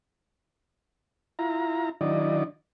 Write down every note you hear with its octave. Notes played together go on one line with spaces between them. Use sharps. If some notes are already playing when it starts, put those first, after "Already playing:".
E4 F4 A#5
D#3 F#3 D4 E4 D5 D#5